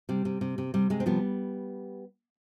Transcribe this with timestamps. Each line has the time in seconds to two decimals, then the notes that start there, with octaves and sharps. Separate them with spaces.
0.09 C3 G3
0.25 C3
0.41 C3
0.58 C3
0.74 C3 G3
0.90 C3 G#3
1.00 C4
1.06 F3 G3 B3